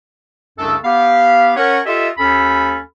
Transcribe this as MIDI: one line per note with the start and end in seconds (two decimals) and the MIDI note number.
0.59 0.75 36
0.59 0.75 42
0.59 0.75 49
0.59 0.75 57
0.59 0.75 62
0.59 0.75 69
0.84 1.52 59
0.84 1.52 67
0.84 1.52 77
1.57 1.80 61
1.57 1.80 70
1.57 1.80 73
1.57 1.80 78
1.86 2.08 65
1.86 2.08 67
1.86 2.08 69
1.86 2.08 75
1.86 2.08 76
2.18 2.78 39
2.18 2.78 61
2.18 2.78 69
2.18 2.78 83